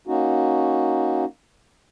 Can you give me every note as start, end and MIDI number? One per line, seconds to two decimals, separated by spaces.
0.07 1.25 58
0.07 1.25 61
0.07 1.25 63
0.07 1.25 66